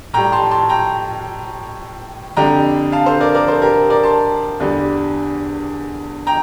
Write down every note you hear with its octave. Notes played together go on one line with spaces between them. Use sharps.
A2 G3 G5 A#5
A5 C6
A5 C6
G5 A#5
F2 D3 G3 G5 A#5
F5 A5
A4 C5
A#4 D5
A#4 D5
A4 C5
G4 A#4
A#4 D5
A5 C6
E2 D3 G3
G5 A#5